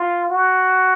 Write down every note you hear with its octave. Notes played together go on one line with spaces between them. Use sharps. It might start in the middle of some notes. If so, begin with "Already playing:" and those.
Already playing: F4
F#4